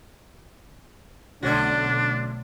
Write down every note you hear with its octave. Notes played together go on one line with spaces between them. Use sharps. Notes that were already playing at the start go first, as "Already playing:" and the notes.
B1 D3 A3 C#4 D4 F#4